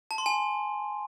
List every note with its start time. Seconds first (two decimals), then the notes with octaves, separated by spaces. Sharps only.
0.11 A5
0.18 C6
0.26 G#5